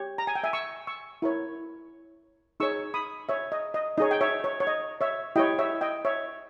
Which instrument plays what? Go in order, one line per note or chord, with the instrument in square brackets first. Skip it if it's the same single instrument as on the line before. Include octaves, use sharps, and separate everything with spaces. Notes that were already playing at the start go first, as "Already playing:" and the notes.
Already playing: [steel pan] G4 C#5
A#5
G#5
G5
E5 G#5
C#6 E6
C#6 E6
E4 A#4 C#5
D#4 G#4 C#5 C#6 E6
B5 D#6
C#5 E5
D#5
D#5
D#4 G#4 C#5 D#5
G5
C#5 E5
C#5
C#5
D#5
C#5 E5
E4 G4 C#5 D#5 G5
C#5 E5
D#5 G5
C#5 E5